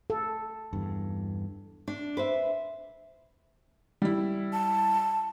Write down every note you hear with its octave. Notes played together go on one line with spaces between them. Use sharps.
A4
E2 G2
D4
B4 C5 E5
G3 E4
A5